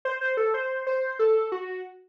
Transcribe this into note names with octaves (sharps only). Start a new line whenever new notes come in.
C5
C5
A4
C5
C5
A4
F#4